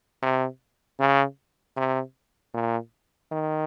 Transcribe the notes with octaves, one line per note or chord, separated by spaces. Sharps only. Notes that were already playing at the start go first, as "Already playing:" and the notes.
C3
C#3
C3
A#2
D#3